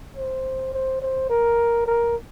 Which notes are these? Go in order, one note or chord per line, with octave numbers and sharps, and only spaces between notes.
C5
C5
C5
A#4
A#4